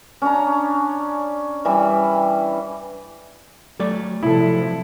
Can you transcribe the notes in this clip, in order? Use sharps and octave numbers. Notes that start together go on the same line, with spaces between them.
C#4 D4 A#5
E3 G3 B5
F#3 A3 D5
C3 F3 E4 A4